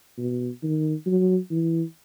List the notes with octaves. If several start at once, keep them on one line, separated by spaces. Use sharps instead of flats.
B2
D#3
F#3
E3